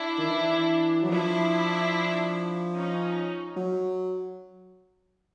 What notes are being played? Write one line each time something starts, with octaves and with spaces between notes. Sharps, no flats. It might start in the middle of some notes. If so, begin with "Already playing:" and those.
Already playing: D4 E4
D#3
E3
F#3
F3 D4 E4
C#4 D#4
F#3